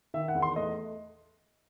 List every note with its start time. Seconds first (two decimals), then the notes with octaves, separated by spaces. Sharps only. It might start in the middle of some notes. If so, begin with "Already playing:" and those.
0.14 D#3 E5
0.28 F#5
0.35 E2
0.42 C6
0.56 A3 D#5